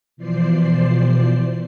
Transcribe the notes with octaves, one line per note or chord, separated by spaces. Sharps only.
B2 E3 F3 C5 D5 C7